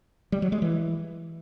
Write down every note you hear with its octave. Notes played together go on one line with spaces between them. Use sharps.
G3
F#3
G#3
E3